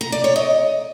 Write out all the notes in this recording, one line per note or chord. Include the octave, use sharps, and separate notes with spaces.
A#5
D5
C#5
D#5